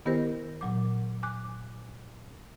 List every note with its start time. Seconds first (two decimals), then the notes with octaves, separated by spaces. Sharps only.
0.06 D#3 B3 E4 G4 A#4 C5
0.61 A#2 F#3 D6
1.23 G#5 D6 F#6